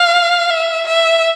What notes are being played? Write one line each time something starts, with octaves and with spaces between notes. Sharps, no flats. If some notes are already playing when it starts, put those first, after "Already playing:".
Already playing: F5
E5
E5